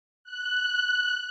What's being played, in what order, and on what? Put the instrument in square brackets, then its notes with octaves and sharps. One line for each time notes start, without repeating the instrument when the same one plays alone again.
[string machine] F#6